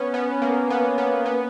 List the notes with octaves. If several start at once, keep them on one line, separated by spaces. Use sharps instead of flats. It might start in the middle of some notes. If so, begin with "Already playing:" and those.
Already playing: B3 C#4
B3
A#3
B3
B3
B3